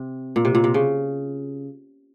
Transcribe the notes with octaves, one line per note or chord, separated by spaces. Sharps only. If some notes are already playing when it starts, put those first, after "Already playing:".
Already playing: C3
A#2
C3
A#2
C3
C#3